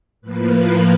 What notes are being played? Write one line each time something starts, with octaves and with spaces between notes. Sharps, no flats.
A2 F3 A#3 B4